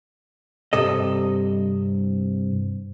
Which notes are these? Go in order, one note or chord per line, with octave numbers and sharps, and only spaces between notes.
G2 C3 A4 D#5